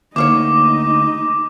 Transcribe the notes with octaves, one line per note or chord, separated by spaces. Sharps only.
D2 A#3 D#4 C#5 D#5 D6